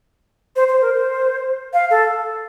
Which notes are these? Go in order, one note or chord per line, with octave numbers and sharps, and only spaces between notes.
C5
C5
A#4
C5
F5
A4